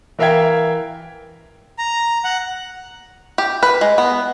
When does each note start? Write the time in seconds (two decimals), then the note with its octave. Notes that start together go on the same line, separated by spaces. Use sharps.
0.19 E3 A#4 E5 F5 G5 G#6
1.78 A#5
2.24 F#5
3.38 G4
3.63 B4
3.81 G#3
3.98 B3